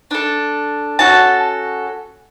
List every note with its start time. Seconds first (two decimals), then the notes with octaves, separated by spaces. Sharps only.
0.11 D4 A4
0.99 C#4 F#4 A4 A5